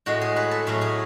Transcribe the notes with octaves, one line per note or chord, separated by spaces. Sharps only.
A2 G#3 F#4
G#4
B4
A4
A2 F#3 A3 C#4
G#4